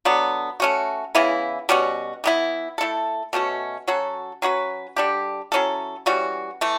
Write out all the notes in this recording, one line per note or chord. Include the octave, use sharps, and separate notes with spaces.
D3 F#3 B3
A3 C#4 F#4
C#3 E3 B3 E4
B2 G3 C#4 F#4
E3 B3 E4
A3 E4 A4
B2 A3 C#4 F#4
F#3 C#4 F#4 A4
F#3 C#4 F#4 B4
D3 G3 D4 G4
F#3 C#4 E4 A4
E3 G3 C#4 F#4
E3 A3